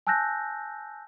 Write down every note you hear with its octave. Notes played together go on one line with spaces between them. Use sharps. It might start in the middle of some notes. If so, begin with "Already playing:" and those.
G#5 A5 E6 F#6 G6 A#6